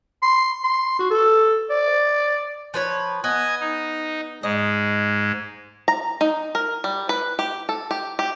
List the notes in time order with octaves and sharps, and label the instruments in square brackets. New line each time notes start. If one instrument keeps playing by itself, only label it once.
[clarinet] C6
C6
F#4
A4
D5
[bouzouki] F3 B4 C#5
[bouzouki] B3 [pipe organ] D#5 G#5
[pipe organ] D#4
[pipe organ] G#2 G#3 [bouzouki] D#5
[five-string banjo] A#5
D#4
A#4
G3
B4
G4
A4
G4
G4